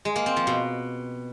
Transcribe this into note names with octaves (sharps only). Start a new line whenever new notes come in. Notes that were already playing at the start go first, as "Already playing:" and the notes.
G#3
A#3
C4
F3
B2